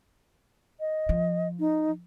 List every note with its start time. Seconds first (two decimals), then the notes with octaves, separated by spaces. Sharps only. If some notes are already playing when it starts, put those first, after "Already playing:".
0.80 D#5
1.09 F3
1.59 D#4